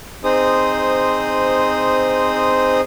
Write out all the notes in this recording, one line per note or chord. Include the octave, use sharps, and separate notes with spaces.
C4 D#4 G#4 C5 D#6